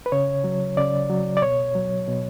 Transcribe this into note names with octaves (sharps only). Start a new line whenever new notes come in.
B4
C#3 C#5
F#3
C#3 D5
F#3
D5
B2 C#5
F#3
B2